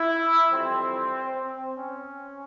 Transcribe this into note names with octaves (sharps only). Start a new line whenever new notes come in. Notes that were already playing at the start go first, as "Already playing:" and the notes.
Already playing: E4
F2 E3 G3 C4
C4
C#4